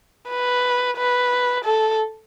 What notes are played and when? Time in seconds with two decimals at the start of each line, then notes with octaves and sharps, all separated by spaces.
0.30 B4
0.97 B4
1.65 A4